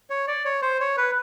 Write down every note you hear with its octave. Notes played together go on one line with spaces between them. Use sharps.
C#5
D5
C#5
C5
C#5
B4